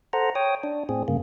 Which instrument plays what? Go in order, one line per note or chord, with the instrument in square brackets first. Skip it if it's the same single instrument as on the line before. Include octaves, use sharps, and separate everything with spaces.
[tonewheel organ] A4 C5 F#5 A#5
C#5 G5 D#6
D4
A2 C4 G#4
G2 C#3 A#3